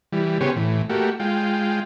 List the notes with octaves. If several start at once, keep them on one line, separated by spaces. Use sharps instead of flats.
E3 G3
C#3 B3 G4 G#4 C5 C#5
A2 E3
A3 A#3 F#4 G4
G#3 F4 G5